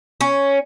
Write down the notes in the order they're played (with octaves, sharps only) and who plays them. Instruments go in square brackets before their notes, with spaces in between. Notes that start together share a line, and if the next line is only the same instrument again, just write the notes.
[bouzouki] C#4